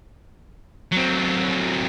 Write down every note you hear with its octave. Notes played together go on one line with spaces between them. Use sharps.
F#3 C4